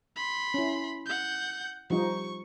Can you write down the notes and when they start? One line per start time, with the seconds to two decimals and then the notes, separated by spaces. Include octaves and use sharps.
0.16 B5 C6
0.54 C#4 E4
1.06 F#5 G6
1.90 F3 G3 D#4 C#6